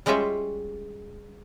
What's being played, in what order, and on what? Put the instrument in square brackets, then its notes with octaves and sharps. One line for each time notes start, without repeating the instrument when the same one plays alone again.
[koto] G3 G#3 C#4 F4 E5